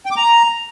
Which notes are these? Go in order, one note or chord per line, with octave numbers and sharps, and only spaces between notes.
G5
D6
A#5